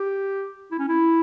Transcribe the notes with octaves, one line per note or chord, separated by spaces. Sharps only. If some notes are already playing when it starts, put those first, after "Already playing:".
Already playing: G4
E4
C#4
E4